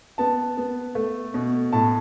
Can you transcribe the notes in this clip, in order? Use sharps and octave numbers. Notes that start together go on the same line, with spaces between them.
B3 A5
B3
A3
B2
A2 A5